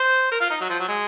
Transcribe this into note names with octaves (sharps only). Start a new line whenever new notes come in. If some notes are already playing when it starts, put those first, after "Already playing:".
Already playing: C5
A#4
F4
D#4
F#3
F3
F#3
G#3